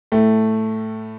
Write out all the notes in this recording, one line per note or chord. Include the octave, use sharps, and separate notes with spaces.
A2 A3